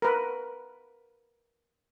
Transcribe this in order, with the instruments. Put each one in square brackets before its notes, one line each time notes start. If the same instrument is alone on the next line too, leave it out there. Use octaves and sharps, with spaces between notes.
[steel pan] A#4 B4